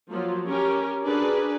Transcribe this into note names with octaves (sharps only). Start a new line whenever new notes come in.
F3 F#3 A#3 F4
C#4 G4 A#4
D4 F#4 G#4 A#4 B4